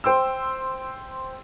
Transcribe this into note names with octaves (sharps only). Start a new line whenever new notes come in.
C5 G5 C6 E6